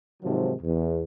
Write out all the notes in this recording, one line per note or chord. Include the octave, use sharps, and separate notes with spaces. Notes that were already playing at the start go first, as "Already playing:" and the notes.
G#2 C3 D#3 F3 F#3
E2